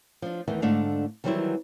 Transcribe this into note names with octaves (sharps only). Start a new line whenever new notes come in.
F3 D4
E2 D#3 E3 A3
G#2 D3 A3 D4 F5
D#3 E3 F#3 G3 C4 E4